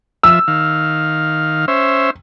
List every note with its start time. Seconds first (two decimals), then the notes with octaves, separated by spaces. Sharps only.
0.23 F3 E5 E6
0.48 D#3 F5
1.68 C#4 C5 E5